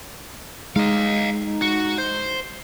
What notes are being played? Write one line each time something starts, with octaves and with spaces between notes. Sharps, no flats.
G#3 D#4 D#5 F5
F#4
C5